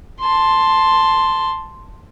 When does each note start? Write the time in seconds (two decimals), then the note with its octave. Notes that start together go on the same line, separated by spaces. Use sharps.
0.21 A5 C6